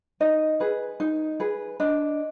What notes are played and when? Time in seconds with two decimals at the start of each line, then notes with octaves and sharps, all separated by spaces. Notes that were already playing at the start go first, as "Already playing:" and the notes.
0.20 D#4 D#5
0.60 G#4 B4
1.00 D#4
1.40 G#4 B4
1.80 D4 D#5